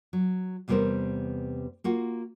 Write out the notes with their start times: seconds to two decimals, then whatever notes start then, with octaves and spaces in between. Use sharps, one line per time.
0.13 F#3
0.68 E2 C3 G3 B3 A#4 C5
1.84 A#3 F4 F#4